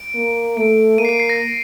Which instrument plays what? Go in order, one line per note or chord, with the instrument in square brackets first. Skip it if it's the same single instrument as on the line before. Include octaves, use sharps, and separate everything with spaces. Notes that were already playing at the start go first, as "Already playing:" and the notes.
Already playing: [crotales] D7
[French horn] A#3
[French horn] A3 [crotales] D7
[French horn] A#3 [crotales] D#7
[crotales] C7
D7
C7
A#6